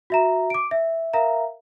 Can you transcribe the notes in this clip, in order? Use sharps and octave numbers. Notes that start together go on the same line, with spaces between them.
F#4 E5 A#5
D6 D7
E5
A#4 E5 F5 A#5